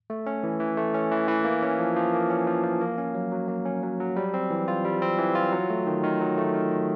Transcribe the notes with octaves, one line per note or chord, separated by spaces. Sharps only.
A3
C#4
E3
E3
A3
C#4
E3
E3
A#3
C#4
F3
F3
A#3
C#4
F3
F3
A#3
C#4
F#3
F#3
A#3
C#4
F#3
F#3
G3
C4
E3
F4
G3
C4
E3
F4
F#3
A3
D#3
D#3
F#3
A3
D#3
D#3